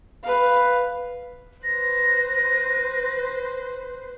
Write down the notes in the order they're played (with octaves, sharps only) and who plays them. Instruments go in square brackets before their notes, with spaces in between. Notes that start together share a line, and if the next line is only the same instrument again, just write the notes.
[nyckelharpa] B4 F5
[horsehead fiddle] B4 C5 [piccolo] A#6